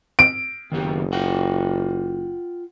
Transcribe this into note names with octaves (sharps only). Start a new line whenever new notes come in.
D7
F#1 D#3 B3 G4
F4 F#5 G5